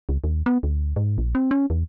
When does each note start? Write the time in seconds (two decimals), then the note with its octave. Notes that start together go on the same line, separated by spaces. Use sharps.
0.09 C#2
0.24 D#2
0.46 B3
0.63 D2
0.96 G#2
1.18 A#1
1.35 C4
1.51 C#4
1.70 E2